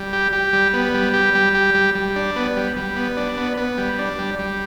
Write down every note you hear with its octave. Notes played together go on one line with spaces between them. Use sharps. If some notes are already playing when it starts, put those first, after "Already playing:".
Already playing: G3
G4
G4
G3
B3
G3
G4
G3
G4
G3
G3
D4
B3
G3
G3
B3
D4
B3
B3
G3
D4
G3
G3